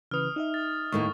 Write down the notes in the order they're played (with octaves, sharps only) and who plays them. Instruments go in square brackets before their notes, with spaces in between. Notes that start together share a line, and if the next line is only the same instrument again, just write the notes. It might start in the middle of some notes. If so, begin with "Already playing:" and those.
[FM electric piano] C#3 E3 B4 [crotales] D#6 F6
[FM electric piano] D#4 D#5 E5
[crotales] A6
[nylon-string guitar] D#2 A2 A#4 [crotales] C#6